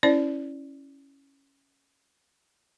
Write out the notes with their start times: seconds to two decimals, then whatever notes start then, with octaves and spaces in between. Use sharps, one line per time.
0.03 C#4 E4 C5 D5